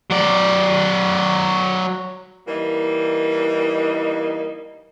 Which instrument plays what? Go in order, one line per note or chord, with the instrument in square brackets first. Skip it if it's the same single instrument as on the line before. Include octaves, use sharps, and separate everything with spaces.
[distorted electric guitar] F#3 D5
[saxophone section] E3 G3 A#3 D#4